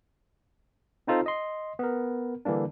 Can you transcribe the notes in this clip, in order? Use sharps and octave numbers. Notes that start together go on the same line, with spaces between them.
C4 D#4 F4 A4 C5
D#5 C6
B3 A#4
D3 E3 G3 A#3 D4